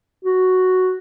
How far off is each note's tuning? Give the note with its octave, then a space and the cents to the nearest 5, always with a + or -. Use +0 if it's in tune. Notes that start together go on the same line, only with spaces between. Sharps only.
F#4 +0